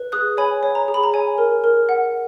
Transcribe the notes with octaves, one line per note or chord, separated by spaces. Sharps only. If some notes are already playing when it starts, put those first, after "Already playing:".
Already playing: B4
G#4 D#6 F#6
C#5 G#5 B5
C#5
A#5
G#4
B5
A#5
C#5 G#5
A#4
A#4
F#5